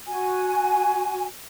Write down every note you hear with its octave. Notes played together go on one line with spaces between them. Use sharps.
F#4 G#5